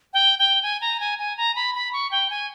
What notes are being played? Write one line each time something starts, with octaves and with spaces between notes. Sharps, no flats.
G5
G5
G#5
A#5
G#5
G#5
A#5
B5
B5
C#6
G5
G#5